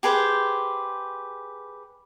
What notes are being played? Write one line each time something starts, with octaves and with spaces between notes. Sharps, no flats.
G4 G#4 B4 C5